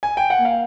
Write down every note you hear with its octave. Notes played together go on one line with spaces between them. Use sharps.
G#5
G5
F#5
A#3
F5